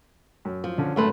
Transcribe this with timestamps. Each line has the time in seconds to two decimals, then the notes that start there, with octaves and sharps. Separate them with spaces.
0.45 F#2
0.64 F3
0.78 D3 C#4
0.96 G#1 F#2 A3 B4 C6